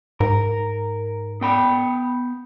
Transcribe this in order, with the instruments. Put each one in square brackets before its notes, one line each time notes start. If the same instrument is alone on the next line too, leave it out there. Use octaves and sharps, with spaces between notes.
[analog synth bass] G#2 [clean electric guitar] A#4
[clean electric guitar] B3 G5 B5